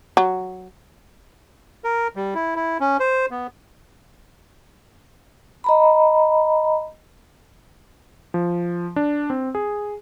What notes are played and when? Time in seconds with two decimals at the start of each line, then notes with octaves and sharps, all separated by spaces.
0.17 F#3
1.84 A#4
2.16 G3
2.35 E4
2.56 E4
2.80 C#4
3.00 C5
3.31 B3
5.64 D#5 A#5 B5
8.34 F3
8.96 D4
9.30 C4
9.55 G#4